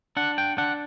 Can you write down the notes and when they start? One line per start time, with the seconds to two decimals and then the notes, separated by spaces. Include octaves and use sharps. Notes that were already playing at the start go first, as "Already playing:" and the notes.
0.17 D4 F#5
0.38 G5
0.58 D4 F#5